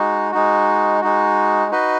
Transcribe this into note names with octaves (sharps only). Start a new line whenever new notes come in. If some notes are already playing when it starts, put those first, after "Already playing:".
Already playing: G#3 D#4 F#4
G#3 D#4 F#4
G#3 D#4 F#4
D#4 F#4 B4 D#5